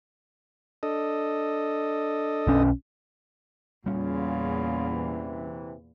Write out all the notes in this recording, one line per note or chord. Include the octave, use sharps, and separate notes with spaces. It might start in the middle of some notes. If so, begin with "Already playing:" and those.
D4 A4 D#5
B1 C#4
E2 A#2 C#3 G3 C#4 F4
C3 E3